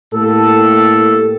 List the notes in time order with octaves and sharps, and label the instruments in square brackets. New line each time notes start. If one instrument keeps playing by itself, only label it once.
[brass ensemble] A2 A#3 G4 A4